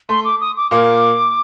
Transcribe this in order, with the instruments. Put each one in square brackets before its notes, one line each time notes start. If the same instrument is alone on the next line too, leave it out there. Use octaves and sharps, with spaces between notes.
[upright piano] A3 [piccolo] C6
[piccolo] D6
D#6
D6
[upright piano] A#2 A#3 [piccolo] D6